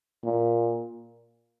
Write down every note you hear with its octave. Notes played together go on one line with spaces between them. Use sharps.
A#2